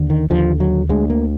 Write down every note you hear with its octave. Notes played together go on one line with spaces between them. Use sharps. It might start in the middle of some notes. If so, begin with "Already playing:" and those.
Already playing: D#2 D3
D#3
D#2 D3 F3
F#3
D2 D3 G#3
A#3